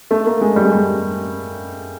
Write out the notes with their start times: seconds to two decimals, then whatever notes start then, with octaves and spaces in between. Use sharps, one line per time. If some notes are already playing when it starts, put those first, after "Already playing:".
0.11 A3
0.26 A#3
0.41 G#3
0.56 G3
0.64 G#3
0.72 G3